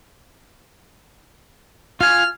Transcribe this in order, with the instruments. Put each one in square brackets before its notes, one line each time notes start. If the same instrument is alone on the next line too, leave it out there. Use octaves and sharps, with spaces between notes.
[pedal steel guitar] F4 G#5 [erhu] F6